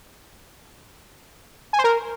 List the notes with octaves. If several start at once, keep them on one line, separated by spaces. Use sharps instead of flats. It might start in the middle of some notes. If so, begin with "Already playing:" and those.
G#5
C5
A#4